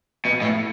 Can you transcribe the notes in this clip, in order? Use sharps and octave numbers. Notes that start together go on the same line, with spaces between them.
B2
A2